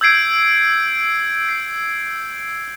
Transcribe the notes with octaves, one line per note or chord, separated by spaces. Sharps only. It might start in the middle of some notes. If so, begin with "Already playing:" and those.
E6 G6 G#6 C7 D7
C7